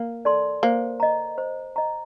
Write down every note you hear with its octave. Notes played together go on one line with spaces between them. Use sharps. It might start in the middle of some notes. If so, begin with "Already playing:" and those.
Already playing: A#3
A4 D5 A5 C6
A#3 C5
D#5 A#5
C5
D#5 A#5